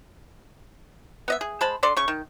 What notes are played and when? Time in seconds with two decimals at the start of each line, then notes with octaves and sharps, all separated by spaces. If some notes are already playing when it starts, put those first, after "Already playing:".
1.28 B3 D#5 E5
1.41 G#4
1.61 G#3 C5 A5 B5
1.83 D3 A4 D5 C6
1.97 C#3 C#6
2.08 D#3